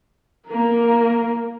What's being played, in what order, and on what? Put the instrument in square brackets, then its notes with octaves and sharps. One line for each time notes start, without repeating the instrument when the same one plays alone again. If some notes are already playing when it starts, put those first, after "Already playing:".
[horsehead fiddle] A#3 A#4